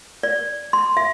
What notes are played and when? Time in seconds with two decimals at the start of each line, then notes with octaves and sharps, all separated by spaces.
0.23 D5
0.73 C6
0.97 E5